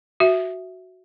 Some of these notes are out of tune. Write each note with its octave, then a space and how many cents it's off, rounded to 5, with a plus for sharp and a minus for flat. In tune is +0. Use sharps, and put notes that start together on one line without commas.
F#4 +0 E5 +0